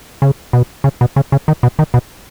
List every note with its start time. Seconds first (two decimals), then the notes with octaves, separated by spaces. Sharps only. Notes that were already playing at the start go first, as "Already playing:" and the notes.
0.22 C#3
0.53 B2
0.84 C#3
1.01 B2
1.16 C#3
1.32 C#3
1.48 D#3
1.63 B2
1.79 D#3
1.94 B2